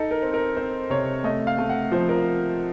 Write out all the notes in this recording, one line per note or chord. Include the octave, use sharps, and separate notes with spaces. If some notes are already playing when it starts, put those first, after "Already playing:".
Already playing: D#4 A4
A#4
C4
A#4
C4 C5
C3 C#5
A3 D#5
F5
A3
F#5
F3 C5
A#4